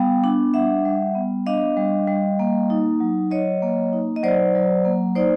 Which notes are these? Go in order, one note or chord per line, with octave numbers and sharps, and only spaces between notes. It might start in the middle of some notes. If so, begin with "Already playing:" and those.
Already playing: G3 B3 F5 G5
D4
G3 E5 F#5
G3
B3
D4 D#5 F5
G3
G3
A#3
D#4
F#3
F#3 C#5 D#5
A#3
D#4
D#5
F#3 C5 D5
F#3
A#3
D#4 C5 D5